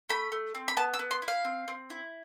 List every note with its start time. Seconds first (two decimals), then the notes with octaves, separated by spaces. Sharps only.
0.09 A3 B5
0.32 A3
0.55 C4
0.68 B5
0.77 B3 A5
0.94 E6
0.99 B3
1.11 C6
1.22 E4
1.28 F5
1.45 C4
1.68 C4
1.90 E4